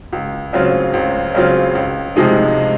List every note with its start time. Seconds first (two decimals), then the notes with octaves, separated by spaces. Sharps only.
0.13 C#2
0.53 C#3 F#3 C4 F4
0.94 C#2
1.35 C#3 F#3 C4 F4
1.75 C#2
2.16 C3 F3 G#3 D#4